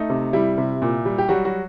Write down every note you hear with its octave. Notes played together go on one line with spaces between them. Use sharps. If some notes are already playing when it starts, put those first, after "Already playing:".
Already playing: A3 D#4
C3
G3 E4
C3
A#2
G3
G4
F#3 G3 F#4
F#3 F#4